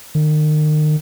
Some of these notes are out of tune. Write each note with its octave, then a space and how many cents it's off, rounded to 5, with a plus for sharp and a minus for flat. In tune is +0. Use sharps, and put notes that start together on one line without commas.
D#3 -35